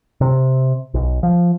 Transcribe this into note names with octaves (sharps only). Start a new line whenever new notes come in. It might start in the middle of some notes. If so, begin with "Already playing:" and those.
C3
B1
F3